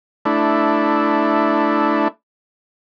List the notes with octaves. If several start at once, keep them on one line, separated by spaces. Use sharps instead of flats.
A3 D4 E4